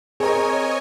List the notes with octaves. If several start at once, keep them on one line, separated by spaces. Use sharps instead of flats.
C4 G#4 A#4 C#5 D#5 G#5